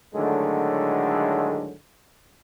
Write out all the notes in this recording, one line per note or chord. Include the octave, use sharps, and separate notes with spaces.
A2 D3 D#3 F#3 G#3 A3